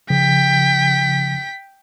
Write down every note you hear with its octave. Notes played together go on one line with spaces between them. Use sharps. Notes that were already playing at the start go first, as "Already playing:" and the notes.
C#3 F3 G5 B6